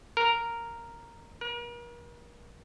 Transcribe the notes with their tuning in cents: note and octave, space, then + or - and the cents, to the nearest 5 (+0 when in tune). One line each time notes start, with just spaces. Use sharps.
A#4 -5
A#4 +40